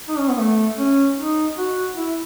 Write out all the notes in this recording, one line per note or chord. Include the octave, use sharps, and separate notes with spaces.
D#4
C#4
B3
A3
C#4
D#4
F#4
E4